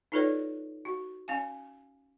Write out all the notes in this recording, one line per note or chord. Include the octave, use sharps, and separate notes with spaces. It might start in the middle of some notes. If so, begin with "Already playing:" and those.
D#4 F4 A4 B4 C#5 D5
F#4
C#4 F5 G#5